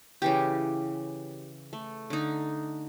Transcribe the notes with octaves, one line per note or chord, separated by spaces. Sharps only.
C#3 E3 G4
A3
D3 D#4